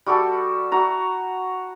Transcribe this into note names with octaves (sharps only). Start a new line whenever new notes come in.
G3 F#4 G4 A4
F#4 A#5